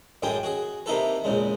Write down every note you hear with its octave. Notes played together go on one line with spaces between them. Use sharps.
F#2 A2 G#3 G5 G#5 D#6
F#4 G#4
C3 A#3 D#4 E4 A4 B4
A#1 E2 C#3 G#3